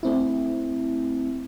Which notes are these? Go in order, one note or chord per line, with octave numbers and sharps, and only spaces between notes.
A3 C4 E4